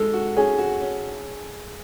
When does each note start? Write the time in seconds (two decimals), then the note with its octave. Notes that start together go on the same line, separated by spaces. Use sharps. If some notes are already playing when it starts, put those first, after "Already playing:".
Already playing: G#3 A4
0.14 F#4
0.37 C#4 G#4
0.58 F#4
0.81 C#4